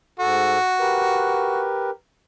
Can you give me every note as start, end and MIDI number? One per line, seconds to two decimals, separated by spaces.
0.20 0.58 44
0.20 1.63 66
0.20 0.58 69
0.80 1.90 67
0.80 1.90 70
0.80 1.90 71